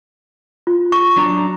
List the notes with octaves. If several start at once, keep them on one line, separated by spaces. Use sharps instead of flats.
F4
C#6
F#3 D4 A#5